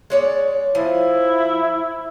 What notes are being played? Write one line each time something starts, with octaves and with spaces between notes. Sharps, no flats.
G#3 C#5 D5
F3 E4